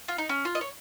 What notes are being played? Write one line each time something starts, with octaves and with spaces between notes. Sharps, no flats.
F4
D#4
C#4
F4
D#5
C#5